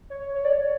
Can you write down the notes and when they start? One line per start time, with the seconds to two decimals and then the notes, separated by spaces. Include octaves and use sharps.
0.10 C#5
0.34 C#5
0.45 D5
0.53 C#5